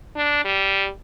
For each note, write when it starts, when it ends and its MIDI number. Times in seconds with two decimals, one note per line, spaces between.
0.16 0.43 62
0.45 0.89 55